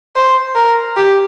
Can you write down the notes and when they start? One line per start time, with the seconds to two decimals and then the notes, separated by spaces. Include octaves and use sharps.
0.16 C5
0.55 A#4
0.96 G4